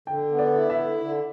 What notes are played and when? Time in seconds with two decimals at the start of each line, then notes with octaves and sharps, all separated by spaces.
0.07 D3 G5
0.31 B3
0.39 D5
0.54 E4
0.70 E5
0.77 D3
1.01 D3